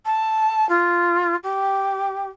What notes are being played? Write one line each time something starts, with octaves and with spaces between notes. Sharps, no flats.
A5
F4
G4